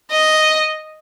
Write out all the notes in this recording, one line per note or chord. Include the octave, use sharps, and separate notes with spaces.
D#5